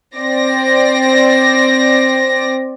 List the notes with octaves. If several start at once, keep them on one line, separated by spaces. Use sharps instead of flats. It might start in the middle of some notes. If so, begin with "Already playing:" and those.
C4 D5 A#6